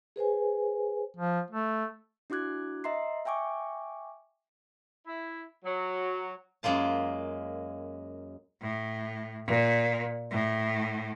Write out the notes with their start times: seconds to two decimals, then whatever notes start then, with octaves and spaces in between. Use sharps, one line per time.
0.16 G#4 B4 C5 G#5
1.17 F3
1.51 A3
2.30 D4 E4 F#4 D6 F#6 G#6
2.84 D#5 E5 A#5 C6 C7
3.25 E5 G5 G#5 C#6 D6
5.06 E4
5.64 F#3
6.63 F#2 G#3 A#3 F4 A5
8.62 A2
9.47 A#2
10.31 A2